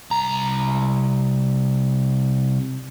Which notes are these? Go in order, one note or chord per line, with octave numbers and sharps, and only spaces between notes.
C2 A#5